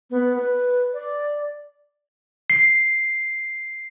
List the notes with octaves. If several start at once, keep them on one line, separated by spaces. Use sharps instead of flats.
B3
B4
D5
C7